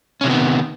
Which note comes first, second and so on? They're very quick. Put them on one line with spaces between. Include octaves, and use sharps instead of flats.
C#4 C3 E3 B3 D#3